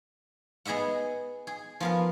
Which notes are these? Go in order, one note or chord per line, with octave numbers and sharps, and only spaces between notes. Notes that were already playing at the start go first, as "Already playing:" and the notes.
B3 G#4 D#5 E5 F#5
G#4
F3 B3 A#4